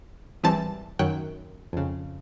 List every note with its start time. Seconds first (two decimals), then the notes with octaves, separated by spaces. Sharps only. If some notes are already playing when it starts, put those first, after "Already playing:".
0.43 G#1 E3 G3 C4 A5
0.99 F#2 D#3 F#3 G5 F#6
1.73 F2 C#3